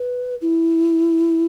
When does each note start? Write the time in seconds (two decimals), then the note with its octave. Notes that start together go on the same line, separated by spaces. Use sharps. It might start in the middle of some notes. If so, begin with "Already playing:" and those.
Already playing: B4
0.42 E4